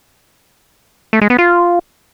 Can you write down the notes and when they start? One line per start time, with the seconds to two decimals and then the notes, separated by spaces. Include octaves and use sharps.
1.13 A3
1.21 G#3
1.30 B3
1.38 F4